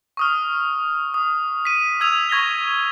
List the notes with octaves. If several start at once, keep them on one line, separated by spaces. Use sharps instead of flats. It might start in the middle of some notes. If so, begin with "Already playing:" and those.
C#6 D#6 F6
D#6
B6 D#7
D#6 E6 G#6 D#7 F7
C#6 G#6 A#6 B6 G7